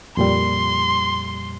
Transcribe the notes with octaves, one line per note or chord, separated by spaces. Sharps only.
F2 A#2 G3 C6